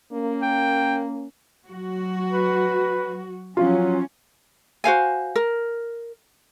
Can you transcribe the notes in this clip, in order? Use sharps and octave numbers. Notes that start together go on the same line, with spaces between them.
A#3 C#4
G5
F#3 F#4
B4
F3 F#3 C#4 F4
F#4 C5 F5 G#5
A#4